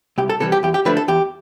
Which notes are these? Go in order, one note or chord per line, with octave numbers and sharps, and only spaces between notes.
C2 G4
A4
C3 E3 G3 A4
G4
E2 G4
G4
D3 F3 A3 D4 B4
A4
E2 G4